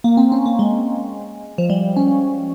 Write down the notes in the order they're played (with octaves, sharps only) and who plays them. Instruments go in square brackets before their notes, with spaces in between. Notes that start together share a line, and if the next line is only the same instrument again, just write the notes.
[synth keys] A#3
C4
C#4
A#3
G#3
F3
G3
C#4